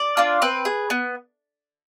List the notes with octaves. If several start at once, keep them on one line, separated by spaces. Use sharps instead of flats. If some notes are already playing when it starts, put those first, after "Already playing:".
Already playing: D5
D4 F4
C4 B4
G#4
B3